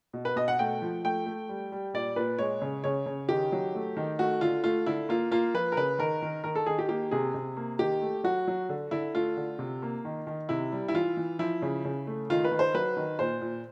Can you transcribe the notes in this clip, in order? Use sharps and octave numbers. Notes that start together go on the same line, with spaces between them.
B2
B4
B2 D#5
F#5
A3 G5
F3
A3 G5
A3
G3
G3
A#2 D5
A#2 B4
G#3 C#5
C#3
C#3 C#5
C#3
D#3 G4
F#3
A3
D#3
A3 F#4
D3 F4
A3 F4
D3 E4
A#3 F4
A#3 F4
F3 B4
A#4
C#3 B4
D#3 A#4
D#3
D#3 A#4
A4
D#3 G#4
G4
A#3 G4
C3 G#4
C3
A#3
D#3 G4
A3
F#3 F#4
F#3
D3
D3 E4
A3 F4
D3
C3
A#3
D#3
D#3
C3 E4
G3
E4
E3 F4
E3
F3 E4
C#3
C#3
A3
D#3 F4
B4
D#3
C5
F#3 B4
D#3
A#2 C5
A#2